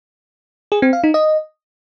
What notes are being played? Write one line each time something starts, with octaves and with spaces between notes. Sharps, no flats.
G#4
C4
F5
D#4
D#5